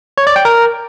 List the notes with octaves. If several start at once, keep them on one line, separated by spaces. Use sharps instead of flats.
C#5
D5
G5
A#4